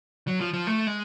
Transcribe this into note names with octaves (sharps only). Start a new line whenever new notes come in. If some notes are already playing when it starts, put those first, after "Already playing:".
F#3
F3
F3
A3
G#3